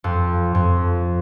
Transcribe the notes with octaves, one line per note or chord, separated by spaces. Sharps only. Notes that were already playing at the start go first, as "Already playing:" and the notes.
F2
F2